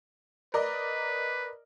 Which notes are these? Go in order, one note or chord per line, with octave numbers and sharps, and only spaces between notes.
A#4 B4 D5 D#5